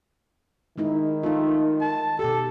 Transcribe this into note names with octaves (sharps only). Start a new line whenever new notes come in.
D#3 G#3 D#4 E4
A3 D#4 F4
A5
B2 G4 A4